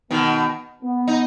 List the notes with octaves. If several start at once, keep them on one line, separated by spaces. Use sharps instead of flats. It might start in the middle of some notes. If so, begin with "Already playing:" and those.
B2 D#3 B3
B3
D#4